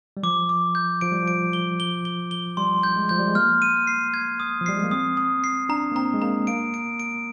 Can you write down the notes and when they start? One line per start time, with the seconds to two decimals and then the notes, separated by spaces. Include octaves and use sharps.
0.17 G3
0.23 F3 D6
0.49 D6
0.75 G6
1.01 F3 D7
1.12 G3
1.22 F3
1.28 D7
1.53 G7
1.80 G7
2.05 G7
2.31 G7
2.57 G3 C6
2.83 G6
2.96 G#3
3.09 F3 G6
3.19 G3
3.27 G#3
3.35 A#3 F6
3.62 D#7
3.87 C7
4.14 G#6
4.40 D#6
4.61 F3
4.66 G3 C7
4.76 G#3
4.84 A#3
4.91 C4 D#6
5.17 D#6
5.44 C7
5.69 D4 A#5
5.91 A#3
5.95 C4 A#5
6.14 G#3
6.22 A#3 A#5
6.47 A#3 D7
6.74 D7
7.00 D7